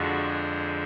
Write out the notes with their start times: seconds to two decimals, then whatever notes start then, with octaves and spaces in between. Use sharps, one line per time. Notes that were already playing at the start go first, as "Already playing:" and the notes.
Already playing: F2 D3 F3 G#3 F#4
0.28 G#4